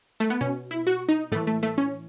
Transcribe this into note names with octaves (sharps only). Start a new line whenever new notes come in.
A3
B3
B2 C#4
E4
F#4
D#4
A2 E3 A3
A3
A3
C#4